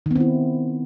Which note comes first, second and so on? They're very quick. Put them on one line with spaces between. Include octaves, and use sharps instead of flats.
D#3 B3 C4 E4